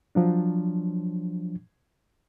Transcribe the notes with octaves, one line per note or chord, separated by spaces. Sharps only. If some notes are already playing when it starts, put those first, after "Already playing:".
F3 F#3 D4